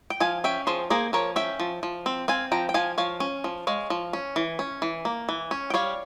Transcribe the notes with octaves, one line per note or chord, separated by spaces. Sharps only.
G5
F3 F5 G#5
C#4 E5 G5
F3 G#4 C5
A#3 G#4 C5
F3 A#4 C#5
C#4 E5 G5
F3
F3
C4
C4 F5 G#5
F3 G5 A#5
G5
F3 F5 G#5
F3 C#5 F5
C#4
F3
G#3 C#5 F5
F3
C#4
E3
C#4
E3
A#3
E3
C#4
G5
G3 C#5 F5